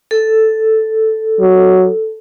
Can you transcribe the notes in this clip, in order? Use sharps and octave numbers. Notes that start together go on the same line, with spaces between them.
A4
F#3